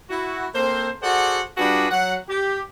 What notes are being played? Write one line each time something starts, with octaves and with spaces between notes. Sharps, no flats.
E4 F#4
A#3 C4 A4 C5
F#4 G#4 A4 C5 D5 F#5
G3 D4 F4 F#4 G#4 B4
F#3 F#5
G4